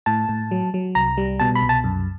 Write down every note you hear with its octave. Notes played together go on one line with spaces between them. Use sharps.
A2 A5
A2
F#3
F#3
C2 A#5
G3
B2 A5
B5
C2
A5
F#2